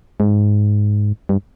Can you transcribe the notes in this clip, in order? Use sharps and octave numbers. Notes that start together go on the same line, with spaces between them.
G#2
G2